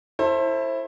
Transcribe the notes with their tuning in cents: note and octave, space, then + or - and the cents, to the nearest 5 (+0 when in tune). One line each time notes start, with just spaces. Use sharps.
E4 +0 A4 +20 C5 +30